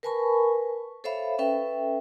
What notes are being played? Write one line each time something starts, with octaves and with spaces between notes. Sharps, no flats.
A#4 B4 G#5 A5 B5 C#6
A4 C5 C#5 E5 F5 B5
C#4 A4 B4 E5 G5